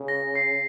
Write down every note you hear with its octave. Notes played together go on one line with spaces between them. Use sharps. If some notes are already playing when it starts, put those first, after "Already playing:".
Already playing: C#3
A#6
C7